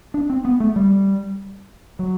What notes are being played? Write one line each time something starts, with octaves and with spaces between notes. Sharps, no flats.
D4
C4
B3
A3
G3
F#3